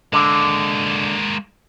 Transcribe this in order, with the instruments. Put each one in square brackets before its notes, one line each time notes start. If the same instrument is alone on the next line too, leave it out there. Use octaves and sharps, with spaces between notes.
[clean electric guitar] D3 [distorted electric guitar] G#3 A#3